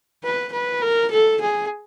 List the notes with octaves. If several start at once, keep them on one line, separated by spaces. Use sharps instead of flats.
B4
B4
A#4
A4
G#4